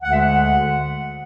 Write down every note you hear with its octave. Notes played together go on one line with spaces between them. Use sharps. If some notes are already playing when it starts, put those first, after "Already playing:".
D2 D3 G#3 F#5
E5
F#5